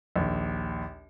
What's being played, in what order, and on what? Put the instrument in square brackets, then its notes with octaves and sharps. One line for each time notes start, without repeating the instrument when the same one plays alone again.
[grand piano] A#1 D#2